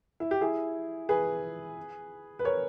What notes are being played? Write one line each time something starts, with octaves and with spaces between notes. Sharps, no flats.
E4
G4
E4 G#4
G#4 B4
B4
A#4 C#5